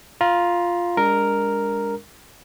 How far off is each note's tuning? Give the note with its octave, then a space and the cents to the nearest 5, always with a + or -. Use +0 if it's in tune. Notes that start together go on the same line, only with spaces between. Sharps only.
F4 +0 A#5 +35
G#3 -40 D4 -20 A#4 +0